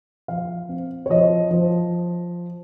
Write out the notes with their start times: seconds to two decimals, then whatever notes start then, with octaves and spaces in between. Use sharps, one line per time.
0.28 F3 F5
0.69 C4
1.06 C#5
1.10 F3 D#5
1.51 F3